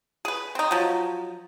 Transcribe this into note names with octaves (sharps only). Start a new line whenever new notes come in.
G#4 B4
C4 D#4
F3 F#3